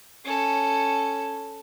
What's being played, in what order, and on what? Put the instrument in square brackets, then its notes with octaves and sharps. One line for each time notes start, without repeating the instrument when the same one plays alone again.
[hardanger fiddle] C#4 A4